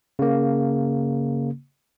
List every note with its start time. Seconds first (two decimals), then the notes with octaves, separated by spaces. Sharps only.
0.19 C#3 A#3